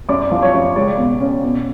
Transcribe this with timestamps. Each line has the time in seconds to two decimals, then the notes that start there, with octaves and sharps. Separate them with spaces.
0.09 F#2 D5 D6
0.31 F3
0.42 C#5 C#6
0.53 F#2
0.76 C#2 D5
0.98 B2
1.21 C#4
1.43 B2